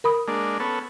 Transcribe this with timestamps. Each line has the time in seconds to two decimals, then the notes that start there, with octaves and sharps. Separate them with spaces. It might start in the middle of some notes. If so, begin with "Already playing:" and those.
0.04 A#4 B5 D#6
0.28 G#3 A#3 D4
0.60 B3 C#4 A4